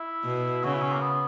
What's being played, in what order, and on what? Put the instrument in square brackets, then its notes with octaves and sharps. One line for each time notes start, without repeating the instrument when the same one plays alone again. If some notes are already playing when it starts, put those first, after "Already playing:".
Already playing: [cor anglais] E4
[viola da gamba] B2
[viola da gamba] C#3 [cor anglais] F#4
[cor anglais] E4
C#4
A#3
B3